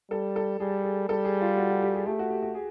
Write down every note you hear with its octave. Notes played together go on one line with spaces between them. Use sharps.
G3 A4
A4
G3 G#4
G#4
G3 A4
G#4
F4
F#4
F#4
G4
G#4
A3 G4
F#4
G4
F#4
G#4